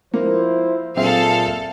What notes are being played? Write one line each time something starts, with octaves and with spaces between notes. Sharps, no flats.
F3 A#3 E4 C5
A#2 F#3 C4 G#4 A4 E5 F5